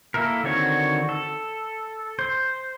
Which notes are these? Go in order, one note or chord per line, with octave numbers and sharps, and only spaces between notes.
A#3 E4 A4 A#4
D3 D#3 C4 F#4 C#5
A4
C5